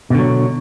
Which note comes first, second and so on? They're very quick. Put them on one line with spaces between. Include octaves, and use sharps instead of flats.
B2 D3 F#3